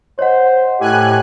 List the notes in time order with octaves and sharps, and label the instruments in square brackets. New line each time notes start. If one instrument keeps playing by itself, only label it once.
[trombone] C5 [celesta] C#5 D#5 F#5
[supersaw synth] A2 G#5 F#6 [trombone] G4